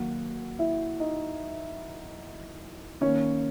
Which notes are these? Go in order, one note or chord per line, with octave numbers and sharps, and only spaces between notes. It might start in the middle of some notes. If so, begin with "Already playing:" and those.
Already playing: D#3 F#3 A#3 F#4 F#5
E4 E5
D#4 D#5
D#3 A#3 C#4 C#5